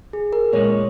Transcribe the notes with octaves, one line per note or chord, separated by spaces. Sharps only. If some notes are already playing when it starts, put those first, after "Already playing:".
G#4
A#4
A#2 G#3 C#4 C#5